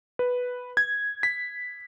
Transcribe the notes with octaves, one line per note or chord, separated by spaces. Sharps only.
B4
G#6
B6